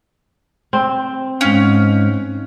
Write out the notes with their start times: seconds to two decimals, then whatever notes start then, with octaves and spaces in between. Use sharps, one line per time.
0.73 C4
1.41 G#2 C#4 F5